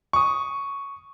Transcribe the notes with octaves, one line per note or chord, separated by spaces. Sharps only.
C#6 D#6